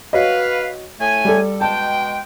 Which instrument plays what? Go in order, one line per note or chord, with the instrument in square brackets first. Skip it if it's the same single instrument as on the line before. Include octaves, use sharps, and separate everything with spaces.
[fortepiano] F#4 C#5 D#5 [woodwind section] B4 F5
[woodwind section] A2 A3 G#5
[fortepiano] G3 A4
[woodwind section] B2 G#3 G5 [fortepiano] A5